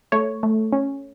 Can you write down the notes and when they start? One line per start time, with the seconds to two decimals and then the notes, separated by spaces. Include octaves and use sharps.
0.12 A3 C#5
0.43 A3
0.73 C#4